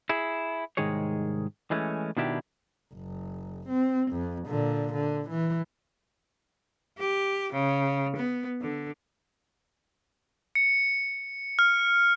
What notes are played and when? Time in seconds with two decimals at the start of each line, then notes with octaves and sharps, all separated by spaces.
0.09 E4 G#4
0.77 C2 G#2 D#3 G#3 G#4 C#5
1.71 E3 G#3 A3 C#4
2.17 B2 D#3 D4 E4 G4
2.94 F#1
3.69 C4
4.12 F2
4.47 A#2 D3
4.93 D3
5.29 E3
6.99 G4
7.53 C#3
8.16 B3
8.61 D3
10.55 C#7
11.59 F6